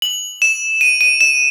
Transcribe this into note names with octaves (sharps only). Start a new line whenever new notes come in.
F#7
E7
D#7
D#7
E7